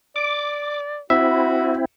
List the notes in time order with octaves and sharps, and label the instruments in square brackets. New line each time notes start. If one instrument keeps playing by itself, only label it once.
[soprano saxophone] D5 [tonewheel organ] D6
[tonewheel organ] C4 E4 [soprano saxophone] F#4 [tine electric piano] E5